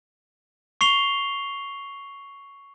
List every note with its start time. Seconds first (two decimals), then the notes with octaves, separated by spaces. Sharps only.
0.81 C#6 C7 F7 G7